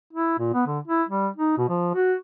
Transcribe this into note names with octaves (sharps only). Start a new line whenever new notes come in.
E4
A#2
B3
D3
E4
G3
D#4
B2
F3
F#4